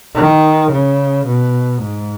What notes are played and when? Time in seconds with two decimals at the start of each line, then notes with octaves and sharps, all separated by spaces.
0.15 D#3
0.71 C#3
1.26 B2
1.82 G#2